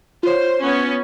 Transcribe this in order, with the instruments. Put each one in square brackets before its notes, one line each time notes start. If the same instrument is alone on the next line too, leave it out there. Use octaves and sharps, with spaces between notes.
[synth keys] F4 C#5 [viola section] C5
[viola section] B3 C#4